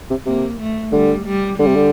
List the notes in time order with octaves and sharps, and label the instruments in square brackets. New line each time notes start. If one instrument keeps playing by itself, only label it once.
[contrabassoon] C3
[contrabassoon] C3 [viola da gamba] A#3
[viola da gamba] A3
[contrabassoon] D3 [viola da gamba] G3
[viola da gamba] G3
[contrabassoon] D3 [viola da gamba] G3
[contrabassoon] C3
D3